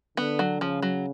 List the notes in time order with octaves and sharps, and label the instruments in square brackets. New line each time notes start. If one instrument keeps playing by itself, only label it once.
[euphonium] D3 [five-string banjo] B3
[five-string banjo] F#3
[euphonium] C#3 [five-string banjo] F3
[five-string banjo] F#3